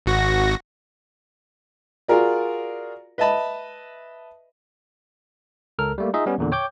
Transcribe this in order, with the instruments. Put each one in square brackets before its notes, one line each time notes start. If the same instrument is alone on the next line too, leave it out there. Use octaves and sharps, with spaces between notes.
[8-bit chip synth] G#1 F#4 A#6
[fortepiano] F4 F#4 G#4 A#4 D5
B4 D#5 E5 A5 B5
[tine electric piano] C#2 A4 A#4 F6
G3 A3 A#3
D#4 F4 G#4 D#5 E5
G3 B3 C#4
E2 A#2 D3
C#5 G5 D6 G6